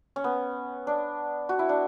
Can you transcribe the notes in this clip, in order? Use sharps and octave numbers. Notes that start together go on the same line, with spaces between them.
C#4
B3
D4
F#4
E4
D4